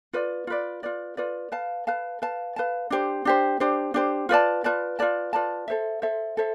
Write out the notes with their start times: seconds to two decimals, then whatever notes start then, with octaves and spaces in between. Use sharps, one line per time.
0.13 F4 B4 D5
0.47 F4 B4 D5
0.83 F4 B4 D5
1.17 F4 B4 D5
1.52 B4 F5 A5
1.87 B4 F5 A5
2.22 B4 F5 A5
2.56 B4 F5 A5
2.90 D4 G4 C5
3.25 D4 G4 C5
3.60 D4 G4 C5
3.94 D4 G4 C5
4.29 F4 B4 D5 A5
4.64 F4 B4 D5 A5
4.99 F4 B4 D5 A5
5.33 F4 B4 D5 A5
5.68 A4 C5 E5
6.02 A4 C5 E5
6.37 A4 C5 E5